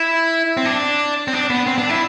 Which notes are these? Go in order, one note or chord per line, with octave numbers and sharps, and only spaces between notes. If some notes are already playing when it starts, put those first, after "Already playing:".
Already playing: E4
C4
D4
C4
D4
B3
C4
D4
E4